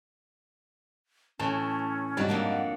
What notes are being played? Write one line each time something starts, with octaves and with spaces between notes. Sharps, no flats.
A2 E3 C#4 A5
G#2 C3 F#3 G3 D5
F2 A#3 D4 F#5